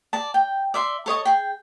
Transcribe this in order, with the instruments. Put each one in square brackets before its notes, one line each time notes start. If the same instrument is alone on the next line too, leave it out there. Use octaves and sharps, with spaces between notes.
[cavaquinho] D5 A5
G5
D5 E5 C6
A4 C#5 D#5 C#6
G#4 G5